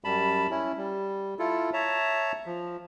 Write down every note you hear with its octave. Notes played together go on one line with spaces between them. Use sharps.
F#2 G3 A5 B5
C#4 E4
G3
E4 F4 A4
C#5 E5 A5 A#5
F3